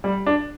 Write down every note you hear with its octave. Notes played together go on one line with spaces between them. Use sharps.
G3
D4